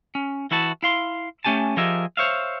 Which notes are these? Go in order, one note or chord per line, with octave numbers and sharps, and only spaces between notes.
C#4
E3 E4 F#4 A5
E4 F5 C6
A3 C#4 G4 G#5 A5
F3 G4 G#4 A#4 D#5 E5
C5 C#5 E5 F5